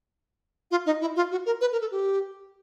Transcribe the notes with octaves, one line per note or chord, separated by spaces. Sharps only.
F4
D#4
E4
F4
F#4
A#4
B4
A#4
A4
G4